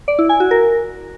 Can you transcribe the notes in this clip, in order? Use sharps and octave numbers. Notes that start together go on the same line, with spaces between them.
D5
E4
G#5
F#4
A#4